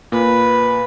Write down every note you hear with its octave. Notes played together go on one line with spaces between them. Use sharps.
A#2 B4